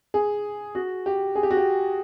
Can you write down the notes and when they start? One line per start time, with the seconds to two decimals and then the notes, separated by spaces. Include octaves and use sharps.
0.14 G#4
0.75 F#4
1.06 G4
1.35 G#4
1.43 G4
1.51 F#4
1.57 G4